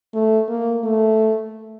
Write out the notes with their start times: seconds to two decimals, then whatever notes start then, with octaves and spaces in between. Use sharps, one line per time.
0.14 A3
0.49 A#3
0.84 A3